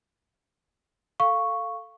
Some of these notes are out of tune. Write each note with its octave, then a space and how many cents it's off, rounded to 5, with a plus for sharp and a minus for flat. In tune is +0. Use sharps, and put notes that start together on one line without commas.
A4 +5 F5 +0 C#6 +0